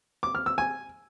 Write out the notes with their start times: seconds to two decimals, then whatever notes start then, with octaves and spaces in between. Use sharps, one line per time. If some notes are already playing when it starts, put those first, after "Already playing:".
0.23 D6
0.35 F6
0.46 E6
0.58 G#5